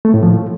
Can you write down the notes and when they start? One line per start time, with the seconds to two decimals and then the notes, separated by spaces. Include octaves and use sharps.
0.05 A3
0.14 A2
0.23 F3